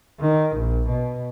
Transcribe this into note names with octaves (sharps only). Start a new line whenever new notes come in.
D#3
A#1
B2